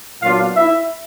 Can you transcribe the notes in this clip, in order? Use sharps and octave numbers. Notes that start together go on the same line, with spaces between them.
A#2 F#3 B3 D4 F4 F5
E4 E5